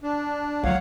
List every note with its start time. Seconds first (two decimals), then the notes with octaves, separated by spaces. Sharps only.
0.02 D4
0.64 C#2 F#3 C#5 F5 F#5